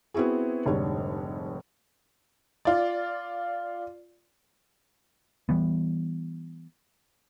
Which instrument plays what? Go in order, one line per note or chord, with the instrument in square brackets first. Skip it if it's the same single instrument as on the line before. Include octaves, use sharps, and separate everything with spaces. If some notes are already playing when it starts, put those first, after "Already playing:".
[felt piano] B3 C4 E4 F#4 G#4
F1 G#2 D3 G3 C#5
[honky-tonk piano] F4 D5
[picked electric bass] E3 G3 B3